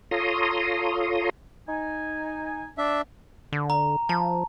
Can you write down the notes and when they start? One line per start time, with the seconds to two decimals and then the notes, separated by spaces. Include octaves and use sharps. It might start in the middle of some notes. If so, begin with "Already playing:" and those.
0.11 F4 A4 C#5 A#5 C6 D#6
1.69 D#4 G#5
2.78 D4 E5
3.53 D3
3.70 A#5
4.09 F3 A5